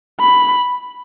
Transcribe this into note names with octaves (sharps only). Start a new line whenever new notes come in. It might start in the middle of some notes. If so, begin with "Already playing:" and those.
B5